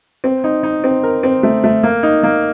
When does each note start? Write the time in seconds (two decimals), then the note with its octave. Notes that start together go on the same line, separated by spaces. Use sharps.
0.24 C4
0.44 D#4
0.63 D#4
0.84 C4
1.03 A#4
1.23 C4
1.43 A3
1.64 A3
1.83 A#3
2.03 D#4
2.23 A#3